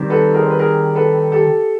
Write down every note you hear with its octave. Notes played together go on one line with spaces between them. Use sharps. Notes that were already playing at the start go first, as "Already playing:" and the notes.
Already playing: D#3 G3 C4
A4 B4
G#4 A#4
C5
B4
G#4 A#4
A4 B4
G4 A4